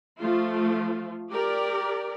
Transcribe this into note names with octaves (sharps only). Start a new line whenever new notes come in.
F3 A3 F4
G4 A#4 D5